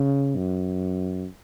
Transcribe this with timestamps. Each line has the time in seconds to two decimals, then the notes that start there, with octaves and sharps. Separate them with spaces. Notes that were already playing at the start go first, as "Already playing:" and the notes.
Already playing: C#3
0.36 F#2